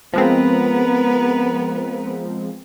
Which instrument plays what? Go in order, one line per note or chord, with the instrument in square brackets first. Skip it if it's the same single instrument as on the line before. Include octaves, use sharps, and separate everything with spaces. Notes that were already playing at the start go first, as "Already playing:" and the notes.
[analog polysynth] F3 G#3 C4 [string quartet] B3 A#4 B4